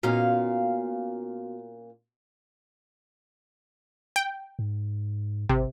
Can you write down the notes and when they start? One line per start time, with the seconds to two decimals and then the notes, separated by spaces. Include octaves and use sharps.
0.03 A#2 B3 C#4 D#4 F#4 F5
4.16 G5
4.59 G#2
5.49 G#1 C3